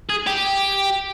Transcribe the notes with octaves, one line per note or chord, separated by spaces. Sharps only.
G#4
G4